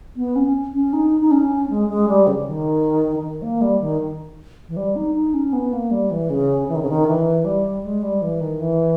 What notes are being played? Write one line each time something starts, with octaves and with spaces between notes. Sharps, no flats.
B3
C#4
C#4
D#4
D#4
C#4
G#3
G#3
G3
C#3
D#3
D#3
A#3
G3
D#3
E3
G3
D#4
D#4
C#4
B3
A#3
G3
E3
C#3
E3
D#3
C#3
D#3
E3
G3
G#3
G3
E3
D#3
E3